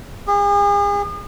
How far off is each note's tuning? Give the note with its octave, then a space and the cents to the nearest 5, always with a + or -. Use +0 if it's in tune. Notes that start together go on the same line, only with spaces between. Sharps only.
G#4 -40